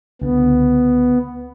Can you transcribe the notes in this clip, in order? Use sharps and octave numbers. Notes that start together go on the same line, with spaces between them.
C#2 D3 B3